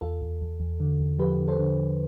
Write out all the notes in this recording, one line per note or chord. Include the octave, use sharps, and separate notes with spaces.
E2 F4 A4
E2
E2
E2
D3
E2
F3 G4 B4
D3
A4 C5
D3
F3